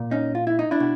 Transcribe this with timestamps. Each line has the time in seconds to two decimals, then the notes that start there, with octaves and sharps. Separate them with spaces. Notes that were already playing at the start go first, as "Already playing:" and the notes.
Already playing: A#2
0.11 C#4 D#4
0.35 F4
0.47 E4
0.59 D#4
0.71 D4 E4
0.80 B2